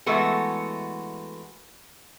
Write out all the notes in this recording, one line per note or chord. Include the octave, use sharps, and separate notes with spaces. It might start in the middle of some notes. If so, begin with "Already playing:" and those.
E3 G#3 A3 B3 F#4 A4